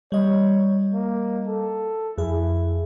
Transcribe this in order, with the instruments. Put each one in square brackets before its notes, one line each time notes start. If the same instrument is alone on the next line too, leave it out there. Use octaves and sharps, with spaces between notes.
[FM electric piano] G3 D#5 [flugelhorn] C#5
[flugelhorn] A#3
A4
[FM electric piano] F2 G#4 [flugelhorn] E4